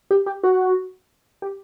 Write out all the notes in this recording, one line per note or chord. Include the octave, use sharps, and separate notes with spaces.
G4
G4
F#4
G4